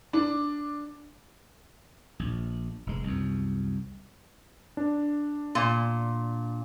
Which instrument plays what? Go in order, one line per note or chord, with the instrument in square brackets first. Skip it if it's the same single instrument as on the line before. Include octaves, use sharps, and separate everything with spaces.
[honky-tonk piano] D4
[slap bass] A#1
F1 G#3
C2 F#2
[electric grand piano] D4
[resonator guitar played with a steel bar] A#2